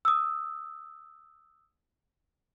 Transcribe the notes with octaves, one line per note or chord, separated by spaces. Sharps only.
D#6 E6